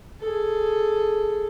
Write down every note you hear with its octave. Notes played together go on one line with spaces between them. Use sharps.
G#4 A4